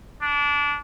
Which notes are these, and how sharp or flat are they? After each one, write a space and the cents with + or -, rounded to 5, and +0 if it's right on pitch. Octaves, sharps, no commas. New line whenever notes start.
D4 -25